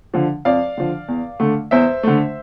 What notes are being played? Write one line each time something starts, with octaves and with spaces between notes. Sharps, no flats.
D3 F3
F2 D5 F5
D3 F3
E2
D3 A3
E2 C5 E5
D3 A3